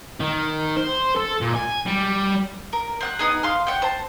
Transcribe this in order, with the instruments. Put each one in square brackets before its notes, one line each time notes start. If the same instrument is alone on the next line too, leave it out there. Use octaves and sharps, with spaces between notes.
[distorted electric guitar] D#3
C5
A4
A#2
G#5
G3
[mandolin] A#4
C4 F#5 F#6
B3 D#4 G#4
F5 C6 F6
C#5 F#5 G5
C5 A5